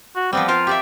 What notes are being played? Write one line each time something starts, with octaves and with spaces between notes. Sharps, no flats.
F#4
F3 G3 B3 C4
F4 A#4 C5 F5
G4 D5 E5